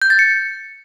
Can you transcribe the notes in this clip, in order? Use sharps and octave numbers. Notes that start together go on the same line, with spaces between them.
G6
A6
C#7